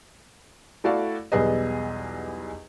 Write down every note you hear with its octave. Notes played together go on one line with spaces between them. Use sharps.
A3 E4 F#4 A4 D5 F5
B1 E2 G3 G#4 B4 D#5